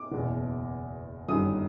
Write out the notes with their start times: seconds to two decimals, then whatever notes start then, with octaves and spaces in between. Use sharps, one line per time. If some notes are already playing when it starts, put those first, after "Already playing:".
Already playing: D6
0.12 F#1 E2 B2
1.28 G1 F#2 D#3 G3 D#6